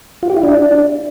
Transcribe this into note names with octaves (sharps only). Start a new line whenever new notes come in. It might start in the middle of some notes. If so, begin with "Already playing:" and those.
F4
G4
E4
D4